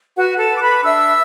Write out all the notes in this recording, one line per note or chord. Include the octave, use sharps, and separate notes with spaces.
F#4 B4 F#5
A4 A5
B4
D6
B4 B5
D4 E5 E6